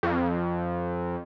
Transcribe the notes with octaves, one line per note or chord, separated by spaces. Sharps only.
F2